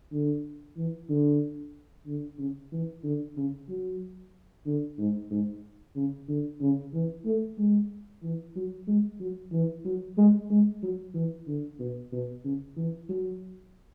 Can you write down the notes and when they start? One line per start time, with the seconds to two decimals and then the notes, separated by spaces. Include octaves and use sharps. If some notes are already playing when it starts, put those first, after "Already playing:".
0.12 D3
0.77 E3
1.09 D3
2.07 D3
2.39 C#3
2.72 E3
3.04 D3
3.37 C#3
3.69 F#3
4.66 D3
4.99 G#2
5.31 G#2
5.96 C#3
6.28 D3
6.61 C#3
6.94 E3
7.26 A3
7.58 G#3
8.23 E3
8.56 F#3
8.88 G#3
9.20 F#3
9.53 E3
9.85 F#3
10.18 G#3
10.50 G#3
10.83 F#3
11.15 E3
11.47 D3
11.80 B2
12.12 B2
12.44 C#3
12.77 E3
13.09 F#3